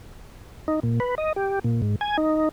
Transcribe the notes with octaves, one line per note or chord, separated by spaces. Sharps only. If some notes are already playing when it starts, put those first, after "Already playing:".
D#4
A#2
B4
D#5
G4
A#2
G#2
G#5
D#4